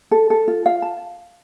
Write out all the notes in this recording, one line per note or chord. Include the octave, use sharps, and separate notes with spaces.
A4
A4
F4
F5
A5